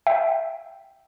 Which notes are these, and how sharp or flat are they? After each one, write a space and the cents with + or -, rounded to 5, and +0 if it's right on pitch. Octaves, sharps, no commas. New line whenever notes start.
E5 +0 G5 -5